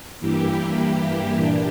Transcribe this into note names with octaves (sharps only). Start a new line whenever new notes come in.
G2 E3 A#3 E4 G4
A#2 A#3 D4 G4